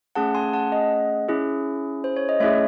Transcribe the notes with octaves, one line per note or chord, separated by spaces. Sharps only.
A3 C#4 G#4 F#5 A5
G#5 C6
F#5 A5
D#5 F#5
C#4 E4 G#4
C5
C#5
D#5
A3 C#4 E4 G#4 C#5 E5